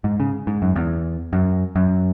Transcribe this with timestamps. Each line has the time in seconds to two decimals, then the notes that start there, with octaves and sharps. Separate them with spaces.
0.04 G#2
0.20 C#3
0.47 G#2
0.62 F#2
0.76 E2
1.33 F#2
1.76 F#2